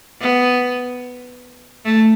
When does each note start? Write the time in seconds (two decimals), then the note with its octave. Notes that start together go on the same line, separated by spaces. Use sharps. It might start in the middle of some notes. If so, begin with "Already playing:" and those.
0.21 B3
1.85 A3